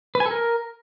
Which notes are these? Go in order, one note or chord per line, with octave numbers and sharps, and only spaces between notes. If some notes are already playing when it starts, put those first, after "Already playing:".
B4
G#5
A4
A#4